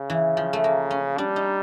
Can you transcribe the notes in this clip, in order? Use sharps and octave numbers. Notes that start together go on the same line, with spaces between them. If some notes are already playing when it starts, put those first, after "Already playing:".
Already playing: C#3
E3
F3
A3
A#3
C#4
G3 D4
D#4